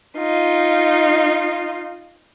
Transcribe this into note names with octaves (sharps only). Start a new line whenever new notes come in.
D#4 F4